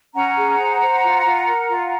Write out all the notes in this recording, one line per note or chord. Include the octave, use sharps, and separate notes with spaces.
C#4 F#5 A#5
G#4
C5
C5
F4
F4
A#4
F4